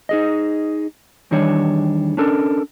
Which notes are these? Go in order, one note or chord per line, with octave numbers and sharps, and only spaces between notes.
D#4 G#4 D#5
E2 D#3 G3 D4 C#5
C#4 D4 A4 A#4